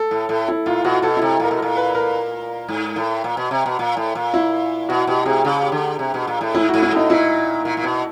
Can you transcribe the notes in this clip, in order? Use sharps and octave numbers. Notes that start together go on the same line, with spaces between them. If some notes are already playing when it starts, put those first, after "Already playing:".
Already playing: A4
A2
A2
E4
A#2 F4
B2 F#4
B2 A4
E4
C3
A#2 A#4
B2
A#2 A#4
B4
A#4
G#2
A2
A#2
B2
C3
B2
A#2
A2
A#2
E4
B2 F#4
B2 G4
C3 G#4
C#3 G#4
G4
D3
C3
B2
A#2
A2
G#2 E4
F#4
G#2
E4
A2 D#4
A#2 E4
A#2
A#2
B2